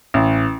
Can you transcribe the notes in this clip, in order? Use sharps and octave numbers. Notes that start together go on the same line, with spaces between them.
A1